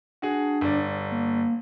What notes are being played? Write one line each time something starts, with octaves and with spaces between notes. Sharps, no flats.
D4 F#4 G#4
G1 D5
A#3